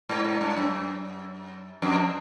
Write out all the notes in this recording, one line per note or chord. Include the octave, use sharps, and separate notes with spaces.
G#2
G#2
G2
F#2
F2